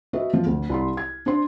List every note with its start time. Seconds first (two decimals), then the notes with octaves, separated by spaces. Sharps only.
0.13 F#4 A4 B4 D#5 E5
0.33 F3
0.46 D2
0.70 C2 B5 C6
0.97 G#6
1.26 D4 C5 C6